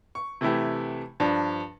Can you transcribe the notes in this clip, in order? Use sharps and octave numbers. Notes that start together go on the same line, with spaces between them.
C#6
C3 E3 A3 E4 G4
G2 F3 D4